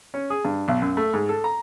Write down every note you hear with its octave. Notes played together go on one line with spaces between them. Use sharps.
C#4
G#4
G2
B1
F#2
A3
G#2
A4
A#5